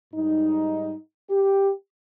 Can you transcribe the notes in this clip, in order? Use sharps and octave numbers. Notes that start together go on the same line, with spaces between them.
G#2 G3 D#4
G4